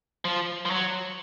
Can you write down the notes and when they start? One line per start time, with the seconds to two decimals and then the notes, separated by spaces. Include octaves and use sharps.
0.25 F3
0.65 F3
0.70 F#3